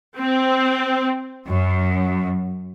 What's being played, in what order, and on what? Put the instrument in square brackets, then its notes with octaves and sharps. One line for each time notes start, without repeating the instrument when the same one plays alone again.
[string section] C4
F#2